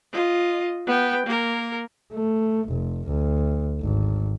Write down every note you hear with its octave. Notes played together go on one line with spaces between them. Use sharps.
F4 D#5
B3 G5
A#3 A#4
A3
F1
D2
G#1